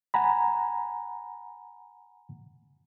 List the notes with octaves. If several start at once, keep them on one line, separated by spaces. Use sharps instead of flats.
F#5 G#5 A#5 B5